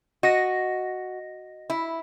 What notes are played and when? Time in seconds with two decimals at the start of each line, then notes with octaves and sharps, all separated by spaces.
0.23 F#4 D#5 A#6
1.70 E4